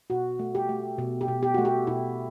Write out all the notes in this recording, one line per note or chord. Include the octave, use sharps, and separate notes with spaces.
B2 F#4
A3
G4
A3
B2
G4
B2
G4
A3 F#4
G4
B2 E4